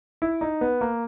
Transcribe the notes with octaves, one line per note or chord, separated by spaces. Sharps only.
E4
D#4
B3
A#3